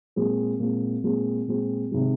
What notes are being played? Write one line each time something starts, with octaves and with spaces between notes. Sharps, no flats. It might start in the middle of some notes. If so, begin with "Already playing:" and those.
A#2 G#3 C4
A#2 G#3 C4
A#2 G#3 C4
A#2 G#3 C4
C3 D#3 G#3